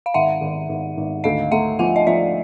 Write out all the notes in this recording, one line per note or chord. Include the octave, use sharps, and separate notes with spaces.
F5
G#1 E5 F#5
G#1
G#1
G#1
D2 D#5 F5
A3 E5 F#5
F3 F#5 G#5
D#5
F3 D5 E5